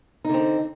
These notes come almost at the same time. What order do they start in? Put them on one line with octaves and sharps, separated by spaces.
D#4 D3 C4